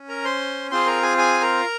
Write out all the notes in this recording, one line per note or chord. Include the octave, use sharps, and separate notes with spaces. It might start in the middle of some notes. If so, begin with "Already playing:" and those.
Already playing: C#4
A#4 A#5
C5 C6
C4 F4 G#4 C5 C6
A#4 A#5
G#4 G#5
G#4 G#5
A#4 A#5